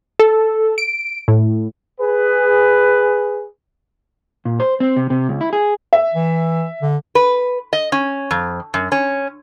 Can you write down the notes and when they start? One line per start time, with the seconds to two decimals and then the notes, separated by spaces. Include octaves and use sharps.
0.19 A4
0.78 D7
1.28 A2
1.99 G#4 B4
4.45 A#2
4.60 C5
4.80 C4
4.97 C3
5.10 C3
5.29 C#2
5.41 E4
5.53 G#4
5.93 E5
6.14 E3
6.82 D3
7.15 B4
7.73 D#5
7.92 C#4
8.31 F2
8.74 F#2
8.92 C#4